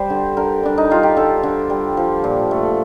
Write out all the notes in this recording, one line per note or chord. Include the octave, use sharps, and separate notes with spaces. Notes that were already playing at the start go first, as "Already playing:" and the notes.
Already playing: G3 C5
D3
D3 A#4
G3 D4
D#4
G3 F4
G4
D3 A4
D3
G3
F3
A#2
A3